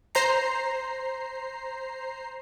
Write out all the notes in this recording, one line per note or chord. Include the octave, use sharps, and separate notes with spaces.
C5 A#5 C7